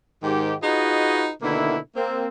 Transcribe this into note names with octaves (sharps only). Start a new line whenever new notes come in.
G#2 D#3 G4
D#4 F4 F#4 G#4 B4 D#5
B2 D3 D#3 A#3 E4
A#3 C4